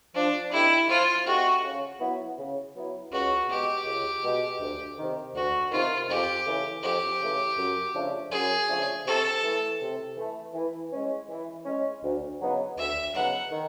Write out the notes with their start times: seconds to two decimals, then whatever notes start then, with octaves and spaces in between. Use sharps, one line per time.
0.14 F3 D4
0.52 A3 C4 D#4 E4 G4
0.89 F3 F4
1.26 A3 C4 D#4 F#4 G4
1.64 C#3
2.01 F#3 B3 E4
2.38 C#3
2.74 F#3 B3 E4
3.12 C#2 F#4
3.49 B2 G#3 G4
3.86 C#2
4.24 B2 G#3
4.60 D2
4.97 C3 D#3
5.34 D2 F#4
5.71 C3 D#3 F4
6.09 F2 G4
6.46 C#3 E3 A3
6.83 F2 G4
7.20 C#3 E3 A3
7.58 F#2
7.94 C#3 F3 A3 D4
8.31 F#2 G#4
8.69 C#3 F3 A3 D4
9.06 C3 A4
9.43 E3 A3
9.81 C3
10.18 E3 A3
10.54 E3
10.92 G#3 C#4
11.30 E3
11.66 G#3 C#4
12.03 D2
12.41 C#3 F#3 B3 D#4
12.78 D2 E5
13.15 C#3 F#3 B3 D#4 F#5
13.52 D#3